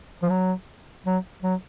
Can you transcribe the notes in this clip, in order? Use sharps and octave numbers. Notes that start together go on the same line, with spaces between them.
F3
F#3
F#3
F#3